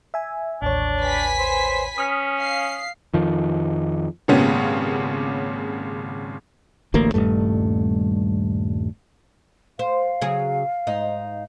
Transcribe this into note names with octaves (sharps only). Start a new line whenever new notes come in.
E5 G#5
A1 D#2 D4 C#5
B4 G#5 B6
C5
C#4 D#6 F6 B6
F5 C7
F2 D#3 F3
G#1 A#2 C#3 B3 C#4 G4
D1 A1 D2 A#3
D#1 B1 G2 A3
C5 F5
C#3 F#3 G#4
G#2 D#4